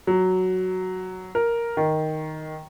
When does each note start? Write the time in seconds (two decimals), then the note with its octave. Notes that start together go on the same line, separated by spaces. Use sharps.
0.07 F#3
1.35 A#4
1.77 D#3